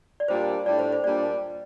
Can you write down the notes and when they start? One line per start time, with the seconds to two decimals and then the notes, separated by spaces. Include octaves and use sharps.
0.20 D5
0.28 A#2 G3 D4 C5
0.66 A2 G3 D4 D5
0.79 C5
0.92 C5
1.04 A#2 G3 D4 D5